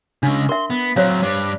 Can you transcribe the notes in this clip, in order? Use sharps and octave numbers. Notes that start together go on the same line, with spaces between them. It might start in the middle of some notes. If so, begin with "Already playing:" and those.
C#3 G#3 D4
A#4 E5 C6
B3
F#3 C4 C5 C#5 F5
G2 D4